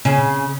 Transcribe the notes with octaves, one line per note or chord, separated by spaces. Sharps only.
C#3